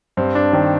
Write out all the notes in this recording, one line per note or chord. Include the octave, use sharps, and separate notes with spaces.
G2 C4
D4
D#3 C4